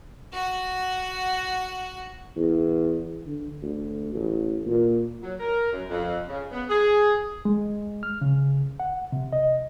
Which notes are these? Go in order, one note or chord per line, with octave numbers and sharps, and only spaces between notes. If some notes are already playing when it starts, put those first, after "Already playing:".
F#4 F#5
E2
D3
D2
A1
A#2
F#3
A#4
F#2
F2
C#3
B3
G#4
G#3
F6
C#3
F#5
C3
D#5